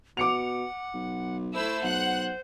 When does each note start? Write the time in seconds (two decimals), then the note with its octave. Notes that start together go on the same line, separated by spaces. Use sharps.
0.17 B2 F#5 D6 C#7 F7
0.94 B1
1.54 A3 E4 C5 E6
1.83 B1 F#5 F#6